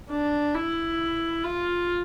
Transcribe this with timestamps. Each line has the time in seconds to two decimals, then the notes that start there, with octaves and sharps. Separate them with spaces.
0.10 D4
0.55 E4
1.44 F4